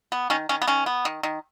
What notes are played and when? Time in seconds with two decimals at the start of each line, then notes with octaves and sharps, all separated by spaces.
0.12 B3
0.30 D#3 C#4
0.49 D#3 C#4
0.62 B3
0.67 D#3 C#4
0.86 B3
1.05 D#3
1.23 D#3